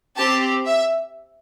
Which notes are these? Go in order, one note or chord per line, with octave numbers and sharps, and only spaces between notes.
C4 G4 A5
E5